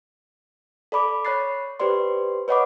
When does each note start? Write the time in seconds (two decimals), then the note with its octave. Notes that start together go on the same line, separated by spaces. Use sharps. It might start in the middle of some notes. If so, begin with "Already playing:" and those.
0.92 A4 D5 B5 D6
1.25 C#5 B5 F#6 A6 C7
1.80 G4 B4 C5 D5 C6
2.48 B4 C#5 D#5 F#5 B5 D6